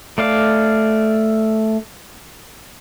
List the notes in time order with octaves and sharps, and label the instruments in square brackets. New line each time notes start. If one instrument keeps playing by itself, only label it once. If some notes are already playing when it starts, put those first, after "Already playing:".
[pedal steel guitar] A3 D5 F5